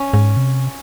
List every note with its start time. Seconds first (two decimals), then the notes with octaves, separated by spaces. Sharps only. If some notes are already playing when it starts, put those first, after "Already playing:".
Already playing: C#4
0.13 G#2
0.37 C3